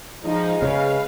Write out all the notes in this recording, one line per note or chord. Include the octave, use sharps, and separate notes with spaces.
F3 G#3 D#4
C#3 B4 F5